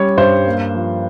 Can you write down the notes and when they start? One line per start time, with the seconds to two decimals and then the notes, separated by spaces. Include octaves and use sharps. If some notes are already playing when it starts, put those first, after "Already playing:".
Already playing: G3 C#4 C#5
0.17 G2 C5
0.46 A#3
0.75 F3